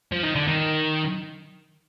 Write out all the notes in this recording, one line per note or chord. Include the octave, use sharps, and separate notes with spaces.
F3
D#3
D3
D#3